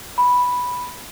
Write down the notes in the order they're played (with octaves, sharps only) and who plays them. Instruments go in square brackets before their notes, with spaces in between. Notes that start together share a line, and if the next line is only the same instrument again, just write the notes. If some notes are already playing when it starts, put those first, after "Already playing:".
[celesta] B5